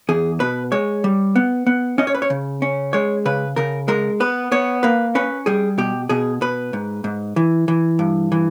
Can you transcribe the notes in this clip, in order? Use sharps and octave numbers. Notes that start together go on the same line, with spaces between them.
E2 G#4
B2 B4
G#3 C#5
G3
B3
B3
C#4 D#5
C#5
B4
C#5
C#3
C#4
G#3 C#5
C#3 B4
C#3 A#4
G#3 A#4
B3 B4
B3 C#5
A#3 B4
C#4 B4
G3 G#4
B2 G4
B2 G#4
B2 B4
G#2
G#2
E3
E3
G2
E3